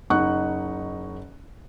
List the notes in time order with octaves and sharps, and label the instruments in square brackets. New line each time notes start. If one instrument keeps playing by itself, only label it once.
[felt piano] F#1 D#4 F#5 C#6 F#6